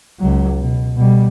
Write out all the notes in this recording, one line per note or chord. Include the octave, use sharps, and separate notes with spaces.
C#2 F#3
B2
B2 G3